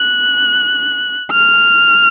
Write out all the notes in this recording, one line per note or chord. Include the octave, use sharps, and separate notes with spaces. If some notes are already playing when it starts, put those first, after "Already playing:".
Already playing: F#6
F6